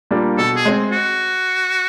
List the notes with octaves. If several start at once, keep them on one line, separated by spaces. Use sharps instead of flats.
A#2 G3 A#3 D4
B2 A4
G#4
G#3 C4
F#4